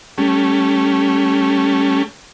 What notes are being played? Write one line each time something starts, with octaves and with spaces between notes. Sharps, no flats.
G3 A3 C#4